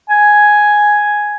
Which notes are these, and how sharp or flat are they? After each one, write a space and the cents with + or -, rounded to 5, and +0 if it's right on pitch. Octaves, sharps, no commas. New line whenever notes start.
G#5 +5